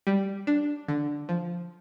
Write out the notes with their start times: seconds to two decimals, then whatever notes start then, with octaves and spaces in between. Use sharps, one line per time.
0.07 G3
0.47 D4
0.88 D3
1.29 F3